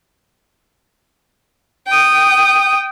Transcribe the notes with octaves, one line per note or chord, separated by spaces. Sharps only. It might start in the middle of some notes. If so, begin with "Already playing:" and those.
G5 D#6